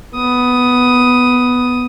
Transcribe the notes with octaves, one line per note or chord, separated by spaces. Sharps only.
B3 D#6